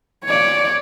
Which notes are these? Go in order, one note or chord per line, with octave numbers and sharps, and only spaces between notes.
C#5 D5